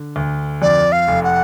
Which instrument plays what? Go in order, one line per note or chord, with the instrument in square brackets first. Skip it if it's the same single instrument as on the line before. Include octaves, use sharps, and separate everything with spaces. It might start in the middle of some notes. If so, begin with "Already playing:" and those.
Already playing: [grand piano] D3
D2
[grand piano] F2 [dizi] D5
[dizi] F5
[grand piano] F1
[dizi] F#5